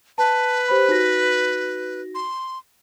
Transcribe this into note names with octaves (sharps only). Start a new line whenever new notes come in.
B4 A5
G4 C5 B5
D#4 F#4 A#6
C6